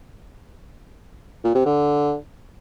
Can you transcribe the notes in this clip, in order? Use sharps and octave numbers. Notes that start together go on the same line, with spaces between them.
A#2
C3
D3